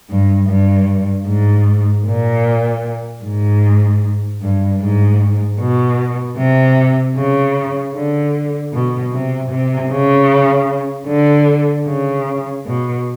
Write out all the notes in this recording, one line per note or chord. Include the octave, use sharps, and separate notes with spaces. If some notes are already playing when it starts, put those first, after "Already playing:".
G2
G2
G#2
A#2
G#2
G2
G#2
B2
C3
C#3
D3
B2
C3
C3
C#3
D3
C#3
B2